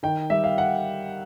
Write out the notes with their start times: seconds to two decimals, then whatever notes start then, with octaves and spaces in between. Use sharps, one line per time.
0.03 D#3 G5
0.30 G3 E5
0.44 F5
0.58 F#5